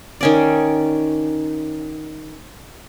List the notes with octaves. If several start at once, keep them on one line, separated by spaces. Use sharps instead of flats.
D#3 C#4 D5